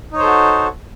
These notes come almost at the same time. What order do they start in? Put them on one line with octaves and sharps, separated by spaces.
D#4 C#5 C5 A4 F#4